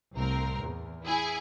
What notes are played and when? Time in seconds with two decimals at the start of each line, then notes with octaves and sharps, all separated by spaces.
0.15 C2 A2 C4 A#4
0.62 E2
1.04 E4 G#4 G#5